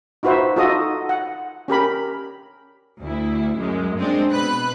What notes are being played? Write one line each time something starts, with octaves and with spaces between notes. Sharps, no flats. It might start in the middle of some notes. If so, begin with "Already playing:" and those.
D#4 F4 F#4 B4 C5 E5
D#4 F4 F#4 A4 D#5 D#6
F#5
C#4 G4 A#4 B5
D2 E4
F#2 G#3
G#3 C4 D4
B2 B4 F#6